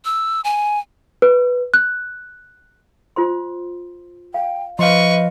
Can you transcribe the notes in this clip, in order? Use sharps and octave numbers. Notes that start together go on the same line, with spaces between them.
E6
G#5
B4
F#6
F4 C5 C6
F5 G5
F3 B4 D#5 F5 C6 C#6